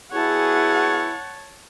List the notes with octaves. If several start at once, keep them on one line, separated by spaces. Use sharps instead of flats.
B3 E4 F#4 G#4 C#5 F#5 A5